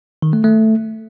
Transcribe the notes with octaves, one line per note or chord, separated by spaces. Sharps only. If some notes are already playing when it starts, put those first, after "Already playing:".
D#3
A3
A3